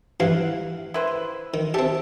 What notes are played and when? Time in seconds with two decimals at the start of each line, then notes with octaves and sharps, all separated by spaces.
0.20 G2 E3 F5 F#5
0.94 E4 B4 C5
1.54 D#3
1.74 C4 G4 E5 A5